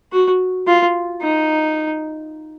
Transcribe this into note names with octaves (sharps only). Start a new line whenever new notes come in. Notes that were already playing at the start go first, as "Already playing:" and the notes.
F#4
F4
D#4